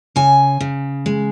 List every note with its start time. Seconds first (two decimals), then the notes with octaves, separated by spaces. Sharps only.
0.16 C#3 G#5
0.61 C#3
1.06 G#3